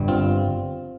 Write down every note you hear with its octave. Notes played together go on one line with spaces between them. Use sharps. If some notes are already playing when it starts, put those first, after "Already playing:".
Already playing: G1 G2 G3
C4 F4